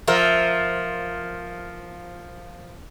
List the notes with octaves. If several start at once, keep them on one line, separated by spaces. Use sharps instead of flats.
F3 A#4 E5